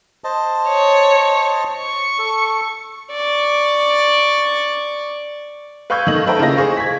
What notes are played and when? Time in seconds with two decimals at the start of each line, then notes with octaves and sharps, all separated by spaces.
0.24 C5 D#5 A5
0.67 C#5
1.78 C#6
2.19 A4
3.11 D5 C#6
5.90 B4 F5 C#6 E6 G6 G#6
6.07 D#3 A3 D#5 F#7
6.27 A4 B4 C5 E5 G5 A#5
6.39 C#3 A#3 E4 F4 D#5 A#6
6.57 G#4 C5 F5 C#6
6.77 G#6 B6